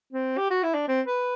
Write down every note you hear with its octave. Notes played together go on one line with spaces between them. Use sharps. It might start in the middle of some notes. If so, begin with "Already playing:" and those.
C4
G4
F#4
E4
D4
C4
B4